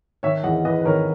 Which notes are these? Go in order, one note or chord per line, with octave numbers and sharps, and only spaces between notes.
D#3 C#5 E5
E2 D#5 F#5
E2 B4 D#5
B4
D#3 A#4 C#5